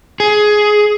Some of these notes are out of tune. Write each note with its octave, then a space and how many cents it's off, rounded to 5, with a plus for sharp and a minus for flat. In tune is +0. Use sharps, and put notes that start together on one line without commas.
G#4 +15